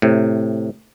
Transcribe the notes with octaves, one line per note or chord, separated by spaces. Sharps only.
A2 C3